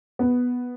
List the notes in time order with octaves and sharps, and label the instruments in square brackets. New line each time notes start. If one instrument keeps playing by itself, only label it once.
[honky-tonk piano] B3